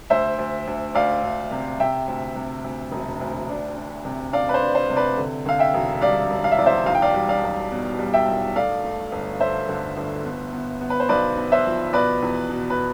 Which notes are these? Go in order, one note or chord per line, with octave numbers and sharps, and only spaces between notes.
D2 C5 E5
D2
D2
D2 D5 F5
D2
C3
C3 E5 G5
D2
C3
D2
E1
D2
D4
D4
C3
D4 D5 F5
B4
C5
D4
C5
C3
B4 D5
D3
D3 F5
E5 G5
E1
G3 D5 F5
E1
F5
E5
E2 D5
C5 E5
B1 F5
G5
D5 F5
G3
D5 F5
B1
B2
G3
E5 G5
B1
A3 D5 F5
A3
G1
A3 C5 E5
D3
G1
B3
B3
B3
B4
C5
B1 B4 D5
B3
C5 E5
F3
B2 B4 D5
E2
B2
B4